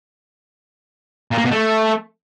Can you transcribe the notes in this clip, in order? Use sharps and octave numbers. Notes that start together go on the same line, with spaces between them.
A#2
A#3
B2
A3